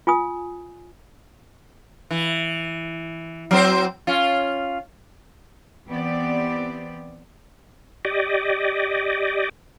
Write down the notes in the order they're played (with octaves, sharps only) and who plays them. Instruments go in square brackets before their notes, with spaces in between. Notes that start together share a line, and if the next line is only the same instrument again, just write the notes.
[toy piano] F4 G#5 D#6
[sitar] E3
F#3 C4 C5
C#4 F4
[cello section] E3 B3 C4 G4 D5
[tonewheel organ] G4 D5 D#5